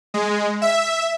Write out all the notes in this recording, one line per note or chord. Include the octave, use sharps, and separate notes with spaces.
G#3
E5